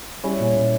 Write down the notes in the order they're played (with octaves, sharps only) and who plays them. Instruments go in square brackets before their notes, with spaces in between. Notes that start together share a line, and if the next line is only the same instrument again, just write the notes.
[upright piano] G3 [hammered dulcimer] C#4 E4
[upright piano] A#2
A#2